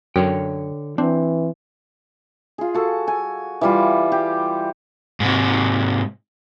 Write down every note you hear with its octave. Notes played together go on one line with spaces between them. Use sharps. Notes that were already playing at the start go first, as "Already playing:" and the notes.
F#2 D3 C#5 G5
E3 C4 D4
F4 G#4
F#4 A4
G#5
E3 G3 F4
G4
G#2 C3